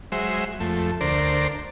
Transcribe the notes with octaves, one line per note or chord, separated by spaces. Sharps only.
F#3 G#3 C5 E5
F2 A3
D2 A#4 C5 D5